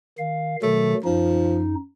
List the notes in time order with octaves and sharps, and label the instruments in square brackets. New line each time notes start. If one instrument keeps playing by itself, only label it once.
[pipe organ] D#3 F5
[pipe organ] B2 D#3 F#3 [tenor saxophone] A3
[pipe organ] F#2 D#4 [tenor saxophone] F3